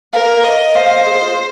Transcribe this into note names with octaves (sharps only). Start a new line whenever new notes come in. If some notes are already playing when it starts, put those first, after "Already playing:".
A#4 F5
D#5
C5 F5
F5
D#5
G#4
F4